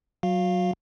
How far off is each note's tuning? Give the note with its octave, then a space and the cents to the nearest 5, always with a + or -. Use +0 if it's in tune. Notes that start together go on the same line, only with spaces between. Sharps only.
F#3 +5 F#4 -35 F5 +0